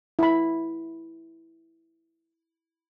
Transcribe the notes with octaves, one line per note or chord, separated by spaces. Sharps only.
E4 B5